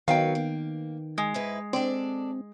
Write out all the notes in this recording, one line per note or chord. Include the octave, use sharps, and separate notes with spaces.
D#3 F#3 B3 F5 G5
A#3
G#3
G#2 E4 B4
C4 D4 A4 D5